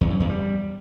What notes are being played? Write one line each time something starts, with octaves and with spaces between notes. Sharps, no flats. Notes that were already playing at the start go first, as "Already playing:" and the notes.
E2
F#2
E2
G3